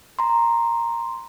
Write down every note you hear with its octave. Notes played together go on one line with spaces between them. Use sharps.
A#5 C6